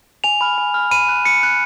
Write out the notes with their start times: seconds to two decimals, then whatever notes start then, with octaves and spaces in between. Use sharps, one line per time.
0.24 G#5 F7
0.41 B5 F6
0.58 G#5
0.74 B5 F6
0.91 B5 D#7
1.09 F#6
1.25 B5 C#7
1.43 F#6